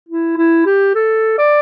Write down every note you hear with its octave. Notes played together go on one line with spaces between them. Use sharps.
E4
E4
G4
A4
D5